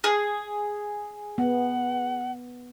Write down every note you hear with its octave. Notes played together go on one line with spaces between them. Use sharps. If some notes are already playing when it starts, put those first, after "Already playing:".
G#4
B3 F#5